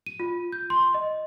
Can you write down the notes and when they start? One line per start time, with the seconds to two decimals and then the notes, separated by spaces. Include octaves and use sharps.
0.06 D#7
0.20 F4
0.52 G6
0.70 C6
0.94 D#5